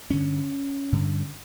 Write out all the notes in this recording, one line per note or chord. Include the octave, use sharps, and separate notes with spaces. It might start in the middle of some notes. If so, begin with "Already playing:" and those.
G2 D3 C#4
G2 D3